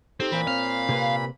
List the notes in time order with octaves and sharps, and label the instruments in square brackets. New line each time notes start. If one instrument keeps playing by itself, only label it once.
[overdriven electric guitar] C4 [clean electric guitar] D#4 G4 A4
[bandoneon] A#2 B5 [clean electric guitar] E3
[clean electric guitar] C4 C5 C#5 [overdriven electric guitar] F5
[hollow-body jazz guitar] C3 A#3 B4